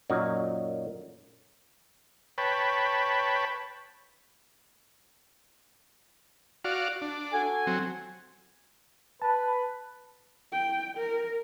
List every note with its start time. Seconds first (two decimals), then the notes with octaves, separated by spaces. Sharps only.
0.10 F#2 A#2 F#3 D#4 A#4 A#5
2.38 B4 C#5 G5 A5 B5
6.64 F#4 D5 F5
7.01 D4
7.32 F#4 A4 G#5
7.67 F#3 C4
9.22 B4 A5
10.53 G5
10.98 A#4